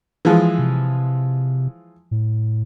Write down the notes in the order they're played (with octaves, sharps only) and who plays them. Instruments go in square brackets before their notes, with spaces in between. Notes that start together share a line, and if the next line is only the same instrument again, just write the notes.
[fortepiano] E3 F3 G#3
[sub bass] C3
A2